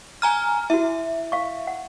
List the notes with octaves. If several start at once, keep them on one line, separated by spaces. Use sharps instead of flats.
G#5 A#5 F6
E4 F#4 E5
F5 C#6
F#5